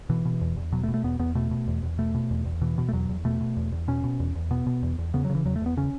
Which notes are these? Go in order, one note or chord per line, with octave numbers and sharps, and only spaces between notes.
B2 E3
B2
E2
E2
B2 F#3
A3
B2
A3
E2 B3
E2 B3
B2 A3
B2
E2
E2
B2 A3
B2
E2
E2
B2 E3
B2
A3
E2 F#3
E2
B2 A3
B2
E2
E2
B2 C#4
B2
E2
E2
B2 B3
B2
E2
E2
C#3 B3
F#3
C#3
E3
E2 F#3
A3
E2 B3
C#3 C#4